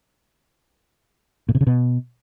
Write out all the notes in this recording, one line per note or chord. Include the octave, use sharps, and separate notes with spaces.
A#2
C3
C#3
B2